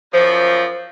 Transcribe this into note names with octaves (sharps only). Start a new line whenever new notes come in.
F#2 F3